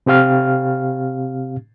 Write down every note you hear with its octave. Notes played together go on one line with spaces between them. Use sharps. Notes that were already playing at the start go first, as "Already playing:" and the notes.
C3 C4 G4 F5 F6